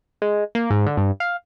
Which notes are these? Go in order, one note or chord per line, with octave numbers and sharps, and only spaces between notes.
G#3
A#3
G#2
D3
G2
F5